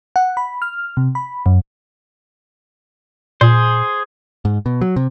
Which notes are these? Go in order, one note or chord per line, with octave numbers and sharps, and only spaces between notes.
F#5
B5
F6
C3
B5
F#2
A#2 G#4 C5
G#2
B2
F#3
C3